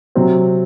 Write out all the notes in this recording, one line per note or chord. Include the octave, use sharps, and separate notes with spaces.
C3 F#3 C4